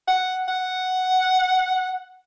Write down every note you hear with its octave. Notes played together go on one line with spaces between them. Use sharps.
F#5
F#5